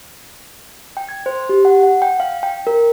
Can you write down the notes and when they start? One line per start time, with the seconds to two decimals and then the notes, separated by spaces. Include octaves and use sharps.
0.97 G5
1.09 G#6
1.26 C5
1.49 G4
1.65 F#5
1.83 F#5
2.02 G5
2.20 F5
2.43 G5
2.67 A#4